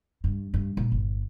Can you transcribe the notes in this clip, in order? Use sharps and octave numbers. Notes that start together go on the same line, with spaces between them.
G2
G2
A#2
G1